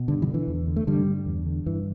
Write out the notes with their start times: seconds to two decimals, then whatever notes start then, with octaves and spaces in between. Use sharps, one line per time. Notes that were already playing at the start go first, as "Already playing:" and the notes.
Already playing: B2
0.08 G2 D3
0.22 E3
0.28 D3
0.34 E3
0.48 E2
0.68 D3
0.76 A3
0.87 G2 D3 G3
1.07 D3
1.26 E2
1.46 D3
1.66 G2 E3